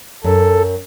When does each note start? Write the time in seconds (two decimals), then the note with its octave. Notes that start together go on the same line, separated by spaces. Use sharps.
0.24 F#2 A4